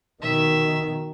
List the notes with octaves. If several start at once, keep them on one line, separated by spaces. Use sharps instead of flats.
B2 D#3 E5